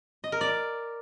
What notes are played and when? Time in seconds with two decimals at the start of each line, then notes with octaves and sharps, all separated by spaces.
0.24 D#5
0.32 A#4
0.41 D5